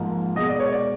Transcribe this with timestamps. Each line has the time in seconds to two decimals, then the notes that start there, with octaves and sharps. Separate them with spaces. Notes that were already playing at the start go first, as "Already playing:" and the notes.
Already playing: G#2 F3 A#3
0.36 B2 G#3 D#5
0.49 D5
0.60 C#5
0.73 D5